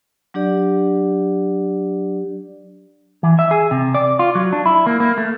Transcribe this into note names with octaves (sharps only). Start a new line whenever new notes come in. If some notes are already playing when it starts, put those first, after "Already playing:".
F#3 D4 G4 D5
E3
E5
G#4
C3
D5
F4
F#3
D4
E4
A#3
A#3
A3